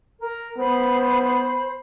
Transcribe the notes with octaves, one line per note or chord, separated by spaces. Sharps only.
A#4
B3 C5 B5